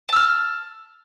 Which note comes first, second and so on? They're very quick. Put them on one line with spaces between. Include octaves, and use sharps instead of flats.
A5 E6 F6